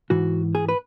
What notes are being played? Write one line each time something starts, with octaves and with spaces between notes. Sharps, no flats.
G#2 E3 F#4
G#4
B4